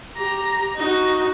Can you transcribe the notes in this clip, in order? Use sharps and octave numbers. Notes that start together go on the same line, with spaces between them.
G4 A#5
D#4 F#4